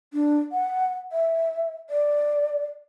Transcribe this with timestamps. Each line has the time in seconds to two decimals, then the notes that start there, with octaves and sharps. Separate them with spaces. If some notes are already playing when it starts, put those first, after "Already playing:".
0.13 D4
0.52 F#5
1.12 E5
1.90 D5